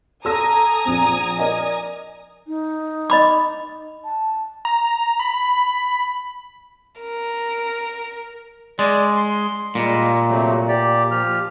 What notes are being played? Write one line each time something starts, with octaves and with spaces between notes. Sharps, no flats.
A4 G#5 A#5 D#6 E6 A#6
A#1 C4
A#4 D5 D#5
D#4
D#5 B5 D6
A5
A#5
B5
A#4
G#3 D5
C6
A#2 G3 G#3 A#3
C3 F#3 A3
G4 D5
F3 G4 F6